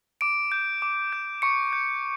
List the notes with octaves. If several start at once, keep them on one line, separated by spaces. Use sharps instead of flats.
D6 D7
G6
D6
G6
C#6 C#7
G6